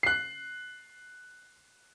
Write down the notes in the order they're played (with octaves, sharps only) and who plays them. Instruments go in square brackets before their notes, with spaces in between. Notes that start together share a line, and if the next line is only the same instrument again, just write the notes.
[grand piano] F#6 C7